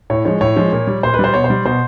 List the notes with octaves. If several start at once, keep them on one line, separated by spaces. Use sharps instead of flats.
A2 C#5
F3 G#3 C#5
A2 C#5
F3 G#3
A#2
G3
A#2 C5
B4
G3 C5
B2 C#5
C5
G3
B2 C5